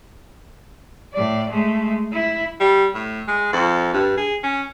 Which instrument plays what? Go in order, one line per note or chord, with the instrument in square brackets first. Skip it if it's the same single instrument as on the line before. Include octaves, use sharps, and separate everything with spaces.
[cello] A2 D5
G#3 A3
E4
[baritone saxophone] G3
A2
G#3
F2
G2
G#4
C#4